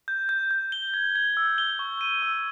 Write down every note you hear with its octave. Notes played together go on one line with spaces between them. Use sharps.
G6
G6
G6
G7
G#6
G#6
E6
G7
C#6
D#7
E6